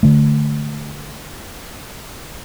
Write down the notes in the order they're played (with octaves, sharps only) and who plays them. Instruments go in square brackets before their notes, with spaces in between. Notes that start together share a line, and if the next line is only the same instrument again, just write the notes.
[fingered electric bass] D3 A3